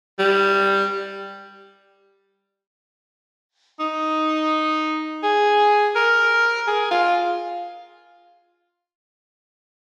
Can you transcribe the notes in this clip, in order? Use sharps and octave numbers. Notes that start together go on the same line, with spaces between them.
G3
D#4
G#4
A#4
G#4
F4